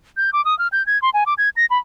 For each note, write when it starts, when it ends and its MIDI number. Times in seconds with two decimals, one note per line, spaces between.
0.17 0.30 91
0.33 0.44 86
0.45 0.57 87
0.59 0.68 89
0.72 0.85 91
0.87 1.01 92
1.02 1.10 84
1.14 1.24 80
1.26 1.34 86
1.38 1.49 92
1.56 1.66 94
1.70 1.78 83